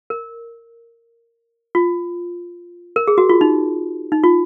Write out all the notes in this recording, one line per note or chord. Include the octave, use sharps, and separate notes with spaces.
A#4
F4
A#4
G#4
F#4
F4
D#4
D#4
F4